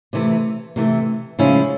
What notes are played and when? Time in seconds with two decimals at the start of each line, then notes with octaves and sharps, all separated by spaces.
0.13 C3 E3 A3
0.76 C3 E3 A3
1.39 C#3 F3 G#3 C#4 E4